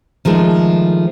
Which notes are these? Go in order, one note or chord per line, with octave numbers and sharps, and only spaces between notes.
D#3 F3 G#3 A3